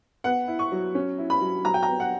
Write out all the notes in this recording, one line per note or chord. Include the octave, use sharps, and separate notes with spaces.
B3 F#5
E4
C#6
F#3
C#4
E4
B5
F#3
F#3 A#5
G5
A#5
B3
F#5